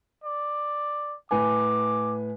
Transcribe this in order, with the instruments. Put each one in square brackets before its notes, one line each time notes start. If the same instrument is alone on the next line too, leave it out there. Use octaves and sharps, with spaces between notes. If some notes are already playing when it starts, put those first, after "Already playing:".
[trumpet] D5
[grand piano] A2 B4 G#5 [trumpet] D6